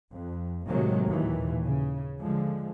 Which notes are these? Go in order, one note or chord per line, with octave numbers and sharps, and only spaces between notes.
F2
A2 C3 D#3 F#3 G#3 A#3
D#2 A#2 E3
C#3
D3 F3 G#3